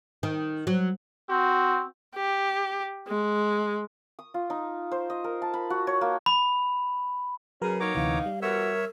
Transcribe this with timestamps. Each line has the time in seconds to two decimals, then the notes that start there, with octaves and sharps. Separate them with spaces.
0.23 D#3
0.67 F#3
1.30 C4 F#4
2.16 G4
3.08 G#3
4.19 D#6
4.34 F4
4.50 D#4
4.91 C5
5.10 D#5
5.24 A#4
5.42 A5
5.54 B5
5.70 F#4
5.87 C#5
6.01 A#3
6.26 B5
7.62 C#3 F#3 C#4 G#4 A#4 B4
7.80 A#3 B3 D#4 C#5 A#5 D6
7.95 D2 C3 E3 F5
8.26 G3
8.42 E3 B3 F#4 A#4 C#5 E5 E6